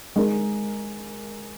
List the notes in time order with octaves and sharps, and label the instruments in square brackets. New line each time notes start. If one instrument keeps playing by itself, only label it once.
[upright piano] G#3 D#4 A#4